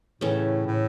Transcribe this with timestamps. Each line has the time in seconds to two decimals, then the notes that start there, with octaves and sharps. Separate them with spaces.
0.21 A2 C#3 E3 A3
0.67 A2